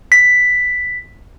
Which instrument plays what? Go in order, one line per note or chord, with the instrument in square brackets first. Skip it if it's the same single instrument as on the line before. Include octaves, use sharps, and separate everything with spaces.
[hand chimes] B6